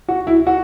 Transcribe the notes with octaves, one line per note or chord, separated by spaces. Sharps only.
F#4
E4
F#4